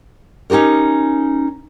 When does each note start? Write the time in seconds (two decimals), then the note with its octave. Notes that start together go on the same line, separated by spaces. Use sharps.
0.50 C#4 D#4 F#4 G4 A#4